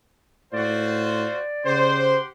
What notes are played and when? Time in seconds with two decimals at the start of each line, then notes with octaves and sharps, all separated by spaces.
0.53 A2 F4 F#4 C5 D5
1.66 C#3 G4 C5 F#5 C6